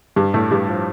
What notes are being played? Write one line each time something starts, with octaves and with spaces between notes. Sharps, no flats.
G2 G3
A2 A3
G2 G3
F3